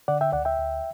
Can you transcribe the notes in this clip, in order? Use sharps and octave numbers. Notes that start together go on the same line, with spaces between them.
D3 D5 F#5
E5 G5
D2 D5 F#5
E5 G5
D2